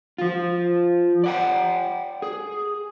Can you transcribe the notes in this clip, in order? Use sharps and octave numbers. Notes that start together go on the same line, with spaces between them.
F3 F4
D5 F#5 G5
G#4